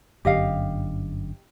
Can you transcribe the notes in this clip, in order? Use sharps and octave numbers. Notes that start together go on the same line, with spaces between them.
G1 F#2 D3 G4 D#5 F5